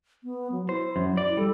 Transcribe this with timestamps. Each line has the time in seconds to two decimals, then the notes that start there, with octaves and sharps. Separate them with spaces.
0.24 B3
0.52 F#3
0.69 E4 C5
0.96 F#2
1.17 D5
1.37 G3 A4